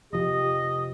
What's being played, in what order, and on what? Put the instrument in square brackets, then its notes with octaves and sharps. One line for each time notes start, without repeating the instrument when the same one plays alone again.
[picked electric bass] F1 F3 [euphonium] G4 [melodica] D#5